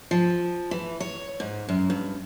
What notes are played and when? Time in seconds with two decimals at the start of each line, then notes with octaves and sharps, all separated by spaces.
0.11 F3
0.71 E3
1.00 C#5
1.40 G#2
1.69 F#2
1.90 G2